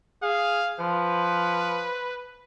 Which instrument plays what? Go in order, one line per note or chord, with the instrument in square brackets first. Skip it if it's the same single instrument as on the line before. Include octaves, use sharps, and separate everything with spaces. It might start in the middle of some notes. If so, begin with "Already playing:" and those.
[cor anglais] G#4 [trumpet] F5
[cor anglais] F3 [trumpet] B4